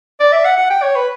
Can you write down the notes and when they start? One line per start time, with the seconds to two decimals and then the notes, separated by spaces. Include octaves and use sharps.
0.20 D5
0.32 E5
0.45 F#5
0.57 F#5
0.70 G5
0.82 C#5
0.95 B4